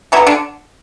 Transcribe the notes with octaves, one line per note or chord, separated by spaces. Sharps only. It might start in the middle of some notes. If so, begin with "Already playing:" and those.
D3 E3 F#3 B3 E4
D3 D4